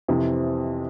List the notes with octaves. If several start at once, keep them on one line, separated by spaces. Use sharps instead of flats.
F2 C3 E3